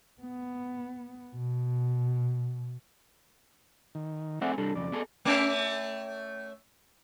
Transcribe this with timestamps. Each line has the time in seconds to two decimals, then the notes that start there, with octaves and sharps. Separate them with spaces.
0.22 B3
1.35 B2
3.95 D#3
4.42 A3 C4 G#4 D5 E5 F#5
4.58 C2 G3 D4 A4
4.75 F2 C#3 D5
4.92 B3 G#4 A4
5.25 A3 C#4 E5